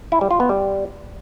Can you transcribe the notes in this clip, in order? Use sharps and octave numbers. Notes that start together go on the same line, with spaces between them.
E4
G3
F4
B3
G3